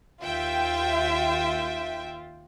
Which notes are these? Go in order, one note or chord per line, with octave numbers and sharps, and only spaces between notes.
D#2 F4 E5 G5